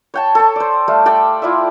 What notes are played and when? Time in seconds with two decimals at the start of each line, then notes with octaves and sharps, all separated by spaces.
0.14 C#5 G5 A5
0.35 A4 C#5
0.56 C5 D5
0.88 G3 A3 F5
1.05 G4 A4 D5 G5
1.42 E4 F4 D5 E5